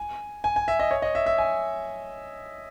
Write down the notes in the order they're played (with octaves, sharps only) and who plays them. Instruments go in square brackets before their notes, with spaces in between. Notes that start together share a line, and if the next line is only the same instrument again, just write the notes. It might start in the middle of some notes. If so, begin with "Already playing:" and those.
Already playing: [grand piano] G#5
G#5
G#5
E5
D#5
C#5
D#5
E5
E5
G#5